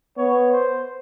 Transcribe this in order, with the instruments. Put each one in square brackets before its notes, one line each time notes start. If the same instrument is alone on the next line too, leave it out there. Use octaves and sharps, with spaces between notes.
[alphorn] B3 [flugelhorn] C#5
[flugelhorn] C5